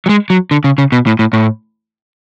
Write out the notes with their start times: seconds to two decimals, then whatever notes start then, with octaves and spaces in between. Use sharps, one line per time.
0.06 F#3
0.09 G#3
0.30 F#3
0.51 D3
0.64 C#3
0.78 C#3
0.92 B2
1.07 A2
1.19 A2
1.33 A2